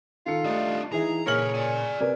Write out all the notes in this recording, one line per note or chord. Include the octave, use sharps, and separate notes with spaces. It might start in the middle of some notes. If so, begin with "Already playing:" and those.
D#3 F4 A4 C#7
G3 A3 D4 D#5
E3 D#4 E4 G#4 A#5
A#2 C#3 G#4 A#4 B4 C#5 F6 F#7
D5 G#5
C3 A#4 B4 D5 G#5